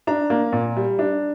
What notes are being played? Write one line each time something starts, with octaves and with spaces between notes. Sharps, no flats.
D4 A#5
A#3
A#2
G3
D4